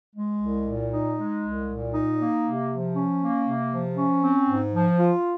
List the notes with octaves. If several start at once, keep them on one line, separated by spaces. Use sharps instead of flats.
G#3
C2
A#2
D#4
G#3
C2
A#2
D#4
A#3
C3
F3
C#4
A#3
C3
F3
C#4
C4
G#2
F3
F4